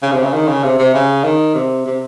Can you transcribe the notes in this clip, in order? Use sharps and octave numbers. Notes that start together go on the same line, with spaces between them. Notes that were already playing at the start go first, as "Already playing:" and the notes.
C#3
C3
C#3
D#3
C#3
C3
C3
C#3
D#3
C3
C3